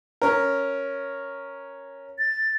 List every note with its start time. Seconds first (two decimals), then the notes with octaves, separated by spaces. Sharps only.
0.22 C#4 A#4
2.19 A6